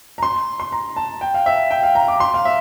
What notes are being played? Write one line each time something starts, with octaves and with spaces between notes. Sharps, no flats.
A#5
C6
C6
A#5
A5
G5
F5
E5
G5
F5
A#5
D6
C6
F5
E5